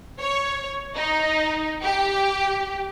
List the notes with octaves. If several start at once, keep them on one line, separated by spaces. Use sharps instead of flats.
C#5
D#4
G4